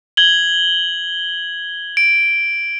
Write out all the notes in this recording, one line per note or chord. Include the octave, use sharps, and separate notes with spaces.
G#6 F#7 G7
D7